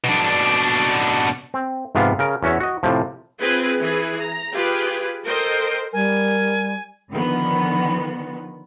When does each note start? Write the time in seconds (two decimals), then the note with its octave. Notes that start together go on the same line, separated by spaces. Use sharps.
0.05 B2 D4
1.54 C4
1.95 G#2 C3 F3 B3 F5
2.19 C#3 A#4
2.43 E2 C#4 F#4 C#5 E5
2.60 F#4 D#5
2.83 A2 C3 F3
3.40 C4 F4 G#4 B4
3.81 E3 G#4 B4
4.18 A#5
4.54 F4 G4 G#4 B4
5.24 A4 A#4 C5 D#5 G5
5.93 G3 A#4 G#5
7.10 D3 D#3 F3 B3